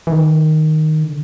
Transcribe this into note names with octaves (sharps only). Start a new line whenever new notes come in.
E3
D#3
D3